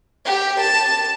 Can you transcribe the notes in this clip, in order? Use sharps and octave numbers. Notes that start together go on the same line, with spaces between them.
G4
A5